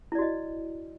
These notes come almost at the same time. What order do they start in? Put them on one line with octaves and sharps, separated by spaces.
E4 D5 F#4 D#5